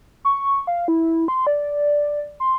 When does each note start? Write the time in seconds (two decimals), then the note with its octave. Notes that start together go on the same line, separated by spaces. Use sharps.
0.25 C#6
0.67 F5
0.88 E4
1.28 C6
1.47 D5
2.40 C6